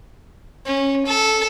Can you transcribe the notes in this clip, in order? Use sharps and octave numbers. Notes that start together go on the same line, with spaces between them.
C#4
A4